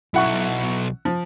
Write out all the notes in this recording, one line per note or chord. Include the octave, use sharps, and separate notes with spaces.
B1 E4 F#5 C#6
F3